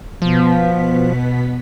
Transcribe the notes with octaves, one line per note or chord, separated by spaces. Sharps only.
B2 F3 B3 B6